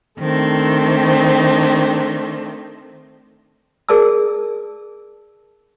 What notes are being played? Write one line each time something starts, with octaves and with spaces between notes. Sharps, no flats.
D#3 A3 C4 D4
G#4 A#4 D5 A5 E6